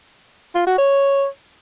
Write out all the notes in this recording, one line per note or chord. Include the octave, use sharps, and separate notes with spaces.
F4
F#4
C#5